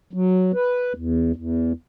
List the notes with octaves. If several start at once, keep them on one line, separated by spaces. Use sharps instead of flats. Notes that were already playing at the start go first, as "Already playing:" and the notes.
F#3
B4
E2
E2